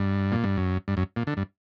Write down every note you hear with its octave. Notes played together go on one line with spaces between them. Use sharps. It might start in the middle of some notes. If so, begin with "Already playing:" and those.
Already playing: G2
A#2
G2
F#2
G2
F#2
A#2
D3
G2